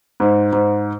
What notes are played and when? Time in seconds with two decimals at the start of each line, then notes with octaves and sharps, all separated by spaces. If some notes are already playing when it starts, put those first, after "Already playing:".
0.20 G#2
0.53 G#2